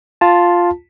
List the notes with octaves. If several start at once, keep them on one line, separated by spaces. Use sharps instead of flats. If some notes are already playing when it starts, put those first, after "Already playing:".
F4 A5